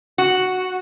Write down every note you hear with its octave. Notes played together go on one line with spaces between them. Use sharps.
F#4